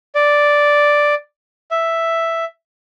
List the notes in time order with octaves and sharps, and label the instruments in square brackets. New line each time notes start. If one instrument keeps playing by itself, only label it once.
[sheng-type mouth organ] D5
E5